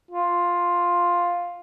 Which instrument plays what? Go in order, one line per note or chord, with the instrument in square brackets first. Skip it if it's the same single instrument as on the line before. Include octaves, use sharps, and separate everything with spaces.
[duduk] F4